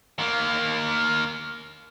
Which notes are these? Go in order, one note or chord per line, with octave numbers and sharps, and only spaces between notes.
D#3 A#3